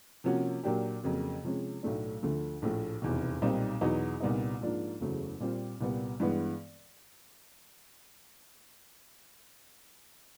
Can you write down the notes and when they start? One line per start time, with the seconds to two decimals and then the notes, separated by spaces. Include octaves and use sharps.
0.24 C3 F3 A#3 C#4 F#4
0.63 A#2 F#3 A#3 D4 G4
1.03 F2 C#3 F#3 A#3
1.43 C3 F3 G#3 C#4
1.83 B1 A2 F#3 A3 D4
2.23 D2 D3 F3 A3
2.62 A#1 A2 F3 A3
3.02 F1 E2 B2
3.42 B1 A#2 G3 C4 D#4
3.81 E2 B2 F#3 B3 D#4
4.20 C2 A#2 G3 B3 D#4
4.61 G#2 F3 A#3 D4 F4
5.00 F#1 E2 C#3 F#3 A3
5.40 A#2 G3 C4 F4
5.80 C2 A#2 G3 B3
6.20 G2 E3 G#3 B3